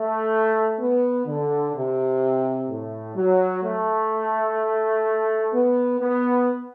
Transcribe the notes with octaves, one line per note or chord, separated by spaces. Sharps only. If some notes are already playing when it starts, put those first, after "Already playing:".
Already playing: A3
B3
D3
C3
A2
F#3
A3
B3
B3